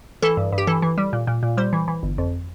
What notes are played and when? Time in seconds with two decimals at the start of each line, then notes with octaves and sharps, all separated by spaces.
0.22 E3 A4
0.37 G2
0.52 G2
0.58 G4
0.67 E3 A4
0.82 E3
0.98 G3
1.13 A#2
1.27 A#2
1.43 A#2
1.57 G3 C5
1.73 E3
1.88 E3
2.03 G1
2.18 F2